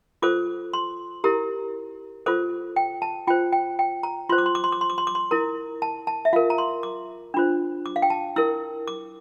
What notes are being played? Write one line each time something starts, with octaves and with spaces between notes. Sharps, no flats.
F4 A4 C5 D6
C6
E4 G4 A#4 A#5
F4 A4 C5 D6
G5
A5
F4 C5 G5
G5
G5
A#5
F4 C5 C6
D6
C6
D6
C6
D6
C6
D6
C6
D6
C6
E4 A#4 A#5
A5
A5
E5
F4 A#4 F5
A#5
C6
D6
D4 F4 C5
D6
F5
G5
A5
E4 A#4 E6
D6